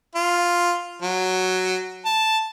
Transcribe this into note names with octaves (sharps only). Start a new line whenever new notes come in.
F4
F#3
A5